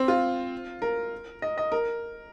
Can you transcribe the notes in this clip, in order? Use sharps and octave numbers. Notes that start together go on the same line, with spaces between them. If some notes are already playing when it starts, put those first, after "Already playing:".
Already playing: C4
F4
A#4
D#5
D#5
A#4